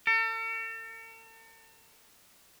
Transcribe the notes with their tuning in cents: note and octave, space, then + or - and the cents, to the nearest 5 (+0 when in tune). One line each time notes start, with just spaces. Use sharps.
A4 +45